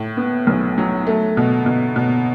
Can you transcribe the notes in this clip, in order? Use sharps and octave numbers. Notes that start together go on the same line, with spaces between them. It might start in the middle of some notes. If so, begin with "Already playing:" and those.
Already playing: A2
B3
B1
F#3
A3
B2
B2
B2